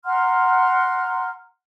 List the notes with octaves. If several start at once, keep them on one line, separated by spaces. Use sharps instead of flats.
F#5 A#5 C6 F6